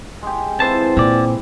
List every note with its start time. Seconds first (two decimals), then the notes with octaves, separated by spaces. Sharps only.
0.22 G#3 G4
0.60 E3 C4 F4 C5 A5
0.97 A#2 D3 D5